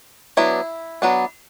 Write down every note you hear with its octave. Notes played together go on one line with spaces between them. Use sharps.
F#3 B3 D4 E4
F#3 B3 D4